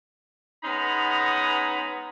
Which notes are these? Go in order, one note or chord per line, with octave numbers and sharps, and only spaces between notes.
G#3 B3 C#4 D#4 A#5 B5